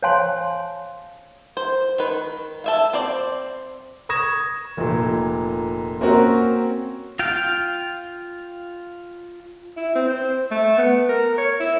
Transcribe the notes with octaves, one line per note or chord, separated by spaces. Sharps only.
C5 C#5 F5 G#5 A5 C6
C5
D#3 B4
A4 E5 F5
C4 C5 D5
C#6 D#6 G#6 A#6 E7
F1 A#2
A#3 C4 C#4 F#4 A#4
F4 F5 G5
E4
C4
C5
A3
B3
A#4
C#5
E4